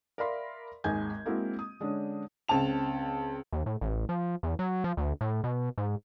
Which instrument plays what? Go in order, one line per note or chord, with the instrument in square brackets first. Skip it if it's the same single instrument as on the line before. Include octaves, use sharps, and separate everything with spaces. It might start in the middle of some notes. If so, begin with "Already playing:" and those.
[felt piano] A#4 D5 E5 F5 B5 C6
G#1 D#2 G#3 G#5 G6 G#6
G#3 A#3 C4 E4 F#4
D#6
D3 G#3 C#4 D4
[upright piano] C#2 C4 A5 F7
[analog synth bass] D#2
A2
A1
F3
E2
F#3
F3
D2
A2
B2
G#2